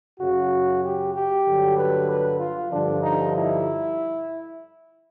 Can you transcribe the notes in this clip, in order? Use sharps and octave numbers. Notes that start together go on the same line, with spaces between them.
F#2 C#3 F#3 F#4
G4
G4
G2 D3 F#3
B4
B4
F4
G2 D3 F3 D4
D#4
E4